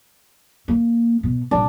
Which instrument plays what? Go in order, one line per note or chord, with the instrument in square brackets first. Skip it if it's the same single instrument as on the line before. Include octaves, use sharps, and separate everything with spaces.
[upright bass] A#3
B2
[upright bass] C2 A#2 [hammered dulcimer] D4